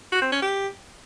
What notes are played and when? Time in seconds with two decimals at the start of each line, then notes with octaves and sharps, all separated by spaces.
0.12 F#4
0.22 C4
0.32 C#4
0.42 G4